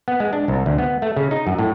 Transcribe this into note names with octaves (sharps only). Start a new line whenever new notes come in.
B3
G#3
D4
C2
D2
B3
A3
C#3
D#4
F#2
A2